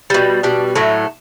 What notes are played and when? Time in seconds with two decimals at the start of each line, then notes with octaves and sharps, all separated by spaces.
0.10 B2 G3
0.43 B2 G3 D4
0.75 A2 F#3 A3